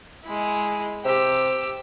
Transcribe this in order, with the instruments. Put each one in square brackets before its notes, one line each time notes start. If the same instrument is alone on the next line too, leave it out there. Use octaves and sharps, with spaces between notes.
[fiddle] G#3 E4
[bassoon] C3 [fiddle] G4 E6